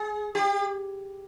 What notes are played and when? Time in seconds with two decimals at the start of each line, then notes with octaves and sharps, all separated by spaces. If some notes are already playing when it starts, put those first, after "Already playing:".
Already playing: G#4
0.35 G4